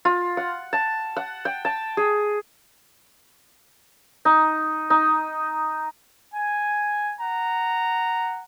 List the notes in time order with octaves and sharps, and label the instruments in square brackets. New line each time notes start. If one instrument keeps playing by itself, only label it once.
[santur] F4
F#5
A5
F#5
G5
A5
G#4
D#4
D#4
[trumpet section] G#5
F#5 A#5